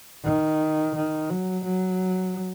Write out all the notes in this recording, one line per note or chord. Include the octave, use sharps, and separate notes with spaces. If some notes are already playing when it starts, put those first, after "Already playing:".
D#3
D#3
F#3
F#3